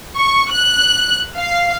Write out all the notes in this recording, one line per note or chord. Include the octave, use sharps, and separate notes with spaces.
C#6
F#6
F5